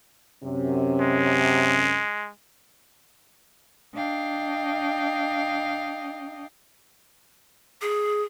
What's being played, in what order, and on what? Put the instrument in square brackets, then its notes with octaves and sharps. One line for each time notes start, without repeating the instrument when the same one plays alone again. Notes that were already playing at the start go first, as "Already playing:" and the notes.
[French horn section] F#2 C3 C#4
[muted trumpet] G#3
[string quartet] D4 D#5 F5 G5
[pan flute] G#4